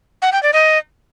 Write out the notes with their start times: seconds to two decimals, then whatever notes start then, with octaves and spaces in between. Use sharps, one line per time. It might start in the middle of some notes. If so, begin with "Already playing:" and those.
0.22 F#5
0.32 G5
0.43 D5
0.53 D#5